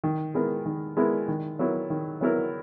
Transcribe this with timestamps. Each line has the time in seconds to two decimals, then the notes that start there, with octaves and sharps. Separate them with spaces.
0.04 D#3
0.34 G#3 B3 E4 A#4
0.66 D#3
0.97 G#3 B3 E4 A#4
1.28 D#3
1.59 F#3 B3 E4 A#4
1.90 D#3
2.21 F#3 B3 E4 A#4